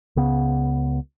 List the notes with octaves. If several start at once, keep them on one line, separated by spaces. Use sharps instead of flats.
C#2 C#3 B3